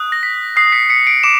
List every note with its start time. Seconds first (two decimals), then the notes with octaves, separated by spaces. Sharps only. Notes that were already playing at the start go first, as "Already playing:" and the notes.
Already playing: D#6 F#6
0.12 A#6
0.23 B6
0.56 D#6 F#6 C7
0.72 B6 C#7
0.89 B6 C#7
1.07 C7 D7
1.23 D6 D7 E7